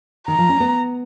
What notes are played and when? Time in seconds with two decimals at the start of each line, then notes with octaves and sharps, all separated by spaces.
0.27 D#3 A#5
0.38 F3
0.49 C#4
0.60 B3